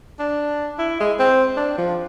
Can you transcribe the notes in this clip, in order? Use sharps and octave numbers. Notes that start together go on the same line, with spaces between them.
D4
E4
G#3
C4
D4
F3